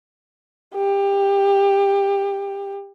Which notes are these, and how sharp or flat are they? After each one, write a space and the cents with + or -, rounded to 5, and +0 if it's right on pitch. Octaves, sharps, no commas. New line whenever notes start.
G4 +20